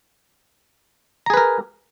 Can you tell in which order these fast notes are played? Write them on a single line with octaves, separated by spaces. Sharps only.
A#5 G#4 B4 A#4